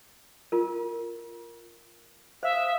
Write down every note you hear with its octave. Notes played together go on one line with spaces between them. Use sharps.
F4 A#4
C5 E5 F5 D#6